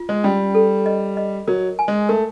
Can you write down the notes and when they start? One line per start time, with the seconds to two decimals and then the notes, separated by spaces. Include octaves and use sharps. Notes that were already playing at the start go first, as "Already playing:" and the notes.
Already playing: F4
0.09 G#3
0.24 G3 C#4
0.55 A4
0.86 D#5
1.17 D#5
1.47 F#3 A#4
1.79 G#5
1.88 G#3
2.09 A3 A#4